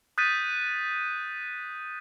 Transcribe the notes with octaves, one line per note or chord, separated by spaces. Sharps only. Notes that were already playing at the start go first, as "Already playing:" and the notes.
D#6 F#6 G6 A6 B6 D#7